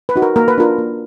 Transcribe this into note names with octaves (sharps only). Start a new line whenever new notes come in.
B4
D#4 F#4
A#4
A#3 A#4
B4
D4 F4 A#4
A#3